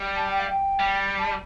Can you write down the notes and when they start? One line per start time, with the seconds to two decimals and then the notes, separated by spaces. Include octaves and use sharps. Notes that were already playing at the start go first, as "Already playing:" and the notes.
Already playing: G3
0.15 A5
0.28 G5
0.40 F5
0.50 G5
0.80 G3
1.18 A5